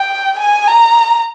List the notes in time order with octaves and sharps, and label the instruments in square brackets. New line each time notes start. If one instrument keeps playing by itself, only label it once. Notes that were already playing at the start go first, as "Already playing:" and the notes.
Already playing: [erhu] G5
G#5
A#5